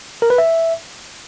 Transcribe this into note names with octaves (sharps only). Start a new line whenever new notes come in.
A#4
B4
E5